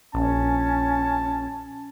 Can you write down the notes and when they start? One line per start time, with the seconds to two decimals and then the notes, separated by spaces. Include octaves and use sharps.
0.14 A#1 C#4 A5